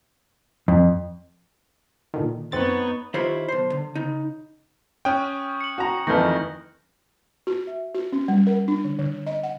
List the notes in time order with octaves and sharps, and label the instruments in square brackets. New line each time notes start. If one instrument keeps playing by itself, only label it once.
[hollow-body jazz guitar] F2
[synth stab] A#2 D3 D#3
[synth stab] F#2 C4 A6 [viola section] B3 D#4 C#5
[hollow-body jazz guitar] D#3 E4 F4 G4 C5 C#5
B1 C5
D3
C#3 D#4
[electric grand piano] C#4 G5 [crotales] C#6 D#6 F#6
[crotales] C#7 F#7
[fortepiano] F#4 A#5
[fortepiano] F2 E3 A3 [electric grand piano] D#3 [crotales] F6 G6 A#6
[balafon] F#4
E5
F#4
C#4
G3
A#4
D4
D3
D3
D#5
F#5